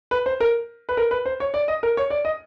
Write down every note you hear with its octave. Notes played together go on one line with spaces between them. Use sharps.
B4
C5
A#4
B4
A#4
B4
C5
C#5
D5
D#5
A#4
C#5
D5
D#5